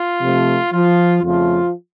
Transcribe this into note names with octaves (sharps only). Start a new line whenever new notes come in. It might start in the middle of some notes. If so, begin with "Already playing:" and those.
Already playing: F4
C3 F3 A3
F3 F4
F2 C#3 F3 A3 F4